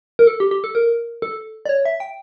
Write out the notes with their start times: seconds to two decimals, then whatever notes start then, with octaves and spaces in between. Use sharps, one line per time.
0.19 A#4
0.27 A4
0.40 G4
0.51 G4
0.64 A4
0.75 A#4
1.22 A4
1.66 D5
1.69 C#5
1.85 E5
2.00 G5